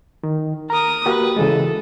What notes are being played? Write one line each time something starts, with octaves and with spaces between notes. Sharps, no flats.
D#3
A#4 A#5 D#6
A#3 F#4 G4 B4
C#3 E3 G#3 A4